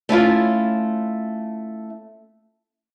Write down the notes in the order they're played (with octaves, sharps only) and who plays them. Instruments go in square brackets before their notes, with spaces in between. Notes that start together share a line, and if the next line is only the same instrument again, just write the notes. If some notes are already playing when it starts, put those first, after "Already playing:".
[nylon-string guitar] A3 C#4 E4 F4